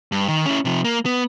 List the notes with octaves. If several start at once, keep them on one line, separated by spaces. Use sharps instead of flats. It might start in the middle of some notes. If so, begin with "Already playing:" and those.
G2
D#3
C#4 E4
C3 F3
A#3
B3